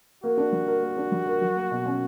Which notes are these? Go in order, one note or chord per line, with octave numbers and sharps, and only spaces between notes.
A#3 F#4
D4
G3
A#4
A#3
D4
G3
A#4
F#3
A#3
B2
C#4